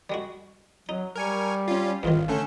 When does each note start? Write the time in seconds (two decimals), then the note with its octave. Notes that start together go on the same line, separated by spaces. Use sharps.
0.10 G3 G#3 F#4
0.89 F#3 D#4
1.16 G3 A#4 G#5 C#6
1.68 C#4 F4
2.03 A1 E2 G#2 D#3 F4
2.28 D3 A3 C#4 A4